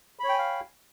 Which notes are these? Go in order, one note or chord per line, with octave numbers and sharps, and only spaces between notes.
C#5 F5 G5 G#5 B5